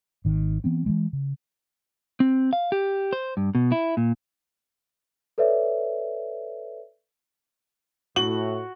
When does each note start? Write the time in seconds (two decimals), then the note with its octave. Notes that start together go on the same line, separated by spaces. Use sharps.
0.25 G#1 D#3
0.64 E3 B3 C4
0.86 E3 F3 G#3
1.13 C#3
2.20 C4
2.53 F5
2.72 G4
3.13 C5
3.37 G2
3.55 B2
3.72 E4
3.97 A#2
5.38 A4 B4 C#5 D5 E5
8.16 A2 F#4 F#7